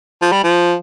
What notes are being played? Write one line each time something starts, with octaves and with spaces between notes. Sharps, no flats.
F3
G3
F3